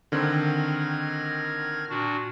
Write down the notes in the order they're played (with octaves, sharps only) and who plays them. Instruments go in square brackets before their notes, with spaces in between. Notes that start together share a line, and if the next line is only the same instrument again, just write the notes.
[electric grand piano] D3 D#3 C4 [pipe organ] F6 G#6 A#6
[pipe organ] A#2 D4 F#4